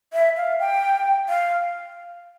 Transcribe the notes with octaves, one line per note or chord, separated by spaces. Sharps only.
E5
F5
G5
F5